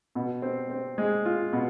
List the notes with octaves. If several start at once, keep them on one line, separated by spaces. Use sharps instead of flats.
B2
C4
C4
G#3
F4
B2